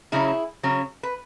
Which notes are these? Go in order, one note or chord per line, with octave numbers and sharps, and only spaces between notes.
C#3 F#3 C#4 E4 G#4
C#3 F#3 C#4
B4